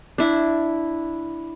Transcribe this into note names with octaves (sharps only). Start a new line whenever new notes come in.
D4 E4